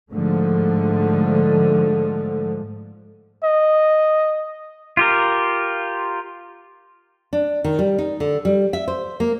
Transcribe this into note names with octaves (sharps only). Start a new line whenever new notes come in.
G#2 D3 F3 A3
D#5
F4 G4 A#4
D4
D#3
G3
D#4
D3
G3
E5
C5
A#3